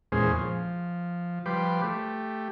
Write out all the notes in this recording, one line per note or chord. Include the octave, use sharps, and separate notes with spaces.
E2 A#2 G#3 C#4 G#4 C5
F3
F3 G3 B4 G5 C6 D6
A3 G4